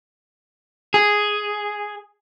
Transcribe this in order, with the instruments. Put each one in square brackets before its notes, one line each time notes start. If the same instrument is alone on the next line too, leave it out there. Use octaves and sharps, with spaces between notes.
[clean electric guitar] G#4